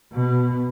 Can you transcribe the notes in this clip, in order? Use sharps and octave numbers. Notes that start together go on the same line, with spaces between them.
B2